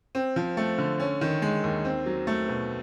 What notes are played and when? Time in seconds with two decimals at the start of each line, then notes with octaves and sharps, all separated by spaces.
0.15 C4
0.36 F3
0.57 A3
0.78 D3
1.00 C#4
1.21 D#3
1.42 G#3
1.64 D#2
1.85 C4
2.06 F#3
2.27 A3
2.49 B2